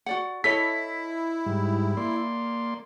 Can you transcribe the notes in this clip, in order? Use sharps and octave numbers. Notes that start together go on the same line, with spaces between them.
F#4 D5 F#5
E4 A4 C#5 D#5 B6
G#2 G3
A#3 D5 C6